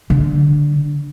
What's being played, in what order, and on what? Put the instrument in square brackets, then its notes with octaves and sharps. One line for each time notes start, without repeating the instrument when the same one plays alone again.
[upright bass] D3